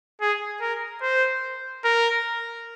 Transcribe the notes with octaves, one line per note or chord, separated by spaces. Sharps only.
G#4
A#4
C5
A#4